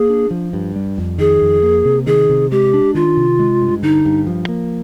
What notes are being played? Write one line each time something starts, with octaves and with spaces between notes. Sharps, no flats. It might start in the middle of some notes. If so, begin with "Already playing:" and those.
Already playing: A#3 G#4
D4
F3
G2
G3
F2
D#3 G#4
F2
A#3
C3
D#3 G#4
C3
G#3 G4
D4
D#3 F4
C3
G#3
G2
D3 D#4
G2
F3
A#3